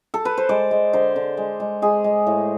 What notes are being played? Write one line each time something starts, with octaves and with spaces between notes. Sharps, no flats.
A4
B4
C5
G#3 D5
G#3
D3 C5
D3
G#3
G#3
G#3 G#4
G#3
A2